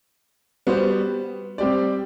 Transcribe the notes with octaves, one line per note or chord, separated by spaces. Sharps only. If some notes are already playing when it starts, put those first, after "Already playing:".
G3 B3 F#4 C5
G3 C4 G4 D5